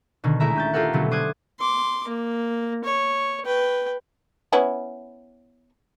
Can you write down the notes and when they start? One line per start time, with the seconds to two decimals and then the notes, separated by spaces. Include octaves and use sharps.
0.24 B2 D3 D#3
0.40 D#1 G#3 A3 E4 E5 A#5
0.56 C#4 G6 A6
0.73 F4 G4 A4 A#4 F#5
0.93 B2 D3 F#3 G3 A3 B3
1.11 D3 C5 D6 D#6 F#6 G#6
1.59 C6 D6
2.08 A#3
2.84 C#5
3.45 B4 G5
4.52 B3 C#4 E4